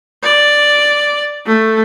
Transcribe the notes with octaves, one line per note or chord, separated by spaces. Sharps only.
D5
A3